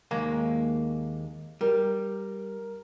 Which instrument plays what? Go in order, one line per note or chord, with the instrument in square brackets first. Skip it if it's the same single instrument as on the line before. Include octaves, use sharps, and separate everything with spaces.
[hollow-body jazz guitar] D#2 G#3 A#3
[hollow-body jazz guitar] G3 [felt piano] A#4